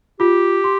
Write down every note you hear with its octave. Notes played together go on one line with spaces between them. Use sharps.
F4 G4
C6